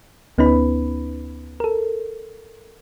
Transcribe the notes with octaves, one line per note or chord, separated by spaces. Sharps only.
D2 B3 C#4 D#4 B4 B5
A4 A#4